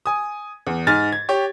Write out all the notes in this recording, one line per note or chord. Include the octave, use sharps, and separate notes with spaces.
G#5 D#6
E2
G#2 G#5 F6 A6
G#6
G4 C#5